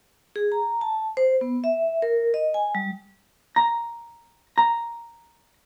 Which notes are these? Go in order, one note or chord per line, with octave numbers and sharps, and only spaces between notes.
G#4
A#5
A5
C5
B3
E5
A#4
D#5
G#5
G3
A#5
A#5